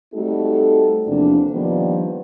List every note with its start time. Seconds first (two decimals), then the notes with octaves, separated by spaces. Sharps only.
0.14 G3 A3 C4 D#4 F#4 A4
1.06 E2 C3 F3 A#3 D4
1.51 D#3 F3 G3 A#3 B3 D4